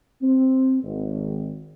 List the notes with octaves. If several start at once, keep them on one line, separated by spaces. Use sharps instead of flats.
C4
G#1